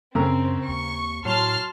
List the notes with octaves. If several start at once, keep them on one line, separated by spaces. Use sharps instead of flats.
F#2 C#3 C4 A#4 E6
D#2 C#6
A2 F#3 A5 C6 F6